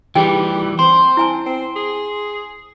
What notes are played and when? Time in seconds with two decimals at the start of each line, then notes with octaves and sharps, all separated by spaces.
0.15 E3 G3 D#4 G4 G#4 G5
0.79 C4 C5 C6
1.17 E4 G#5 A5
1.46 C4
1.76 G#4